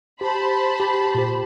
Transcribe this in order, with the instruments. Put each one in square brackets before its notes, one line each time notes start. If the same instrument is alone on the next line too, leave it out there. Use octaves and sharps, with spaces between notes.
[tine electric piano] G4 [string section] C5 A5 B5
[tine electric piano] G4
A#2 G4